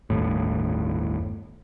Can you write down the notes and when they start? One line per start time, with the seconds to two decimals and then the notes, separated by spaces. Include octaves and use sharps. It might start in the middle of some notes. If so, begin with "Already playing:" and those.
0.10 G1 D#2 A2